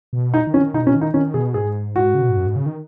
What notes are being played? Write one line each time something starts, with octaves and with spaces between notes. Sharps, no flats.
B2
D#4
D#3
C#4
F#3
D#3
B2 D#4
C#4
D#3
D#4
D#3 C#4
B2 G#4
G#2 G#4
F#4
C#3
B2
G#2
F#2
G#2
C#3
D#3